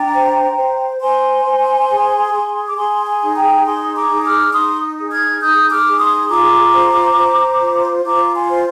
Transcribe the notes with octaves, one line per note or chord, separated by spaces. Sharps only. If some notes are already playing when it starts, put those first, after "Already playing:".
Already playing: D4 G5 A#5
C5
C5
C5 G#5 C6
C5
G#4
G#4
D6
G#4 G#5 C6
G#5 C6
D#4
G5 A#5
G#4 G#5 C6
A#5 D6
D#4
D6 F6
D#4 C6 D#6
G#4
F6 G#6
D#4 D#6 G6
D6 F6
G#4
C6 D#6
F4 A#5 D6
C5
C5
F4
F4 A#5 D6
G#5 C6
C5